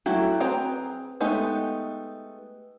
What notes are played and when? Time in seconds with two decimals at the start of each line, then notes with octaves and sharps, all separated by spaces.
0.06 F#3 A3 E4 F#4 G4
0.40 C4 G#4 B4 G5 A#5
1.20 G#3 A3 B3 D#4 G4